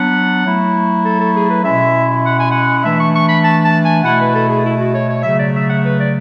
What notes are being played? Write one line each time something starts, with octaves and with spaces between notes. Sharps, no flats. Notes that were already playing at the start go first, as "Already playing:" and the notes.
Already playing: F#3 B3 D4 F#5
F#3 A3 E4
A4
A4
G#4
B4
B2 G#3 C#4 E4 E5
F#5
G#5
F#5
E3 A3 D4 E5
C#6
C#6
B5
A5
A5
G#5
B2 A3 E4 F#5
B4
A4
G#4
E4
F#4
C#5
C#5
C#3 F#3 A3 E5
D5
E5
F#5
B4
D5